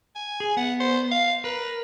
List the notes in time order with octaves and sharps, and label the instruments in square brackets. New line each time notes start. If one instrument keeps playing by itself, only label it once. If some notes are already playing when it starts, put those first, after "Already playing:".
[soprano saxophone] G#5
[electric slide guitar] G#4
[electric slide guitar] B3 [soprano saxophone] F#5
[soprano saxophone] C5
F5
[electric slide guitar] A#4 [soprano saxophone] B4